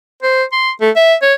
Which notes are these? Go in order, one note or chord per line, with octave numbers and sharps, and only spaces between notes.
C5
C6
A3
E5
C#5